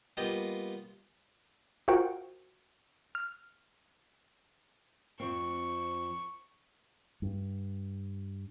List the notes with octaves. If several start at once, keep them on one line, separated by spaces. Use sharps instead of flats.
G3 A#3 B3 F4 D#5 G5
F4 F#4 A#4 C5 F#5 G5
F6
F2 C4 C#6
G2